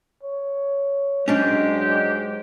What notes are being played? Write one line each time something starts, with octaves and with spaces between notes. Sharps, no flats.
C#5
G#2 F#3 G#3 C#4 D4 G4